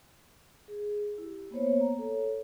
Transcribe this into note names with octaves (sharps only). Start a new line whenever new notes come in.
G#4
E4 G4
A#3 B3 C5 C#5
A#5
A4 C#5